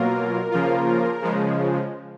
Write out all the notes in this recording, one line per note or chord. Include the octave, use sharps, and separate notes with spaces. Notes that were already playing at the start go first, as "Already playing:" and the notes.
Already playing: B2 F#3 A#3 F4 A#4
C#3 F3 A#3 F4
C#3 F3 G#3